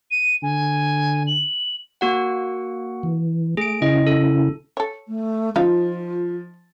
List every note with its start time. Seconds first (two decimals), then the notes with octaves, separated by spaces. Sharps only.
0.11 D#7
0.43 D3 G#5
1.27 F#7
2.01 A#3 F#4 F#5
3.03 E3
3.57 A3 G#4 D7
3.82 C#3 C#4 E4 D#5
4.07 A4
4.77 A4 C#5
5.08 A3
5.56 F3 D#4 F4 F5